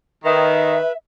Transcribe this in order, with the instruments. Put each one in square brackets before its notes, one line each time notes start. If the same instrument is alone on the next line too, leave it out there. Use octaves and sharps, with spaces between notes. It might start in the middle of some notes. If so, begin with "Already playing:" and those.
[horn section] D#3 [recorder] B4 [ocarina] E5